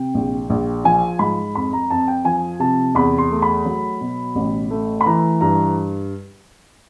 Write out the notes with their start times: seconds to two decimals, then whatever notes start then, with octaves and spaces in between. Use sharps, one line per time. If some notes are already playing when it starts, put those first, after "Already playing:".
Already playing: C3 G5
0.15 A#1
0.50 A#1
0.84 F3 G#5
1.19 G#2 B5
1.55 F2 B5
1.73 A#5
1.90 F2 A5
2.08 G5
2.25 F3 G#5
2.60 C3 A5
2.95 E2 B5
3.18 C6
3.31 A3
3.42 B5
3.65 F#3
4.01 B2
4.35 A1
4.70 A3
5.01 B5
5.06 E3 A#5
5.41 G2 A#5